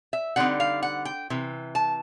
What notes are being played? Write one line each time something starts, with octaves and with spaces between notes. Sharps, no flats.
E5
D3 G3 C4 D#4 F#5
F5
F#5
G5
C3 E3
A5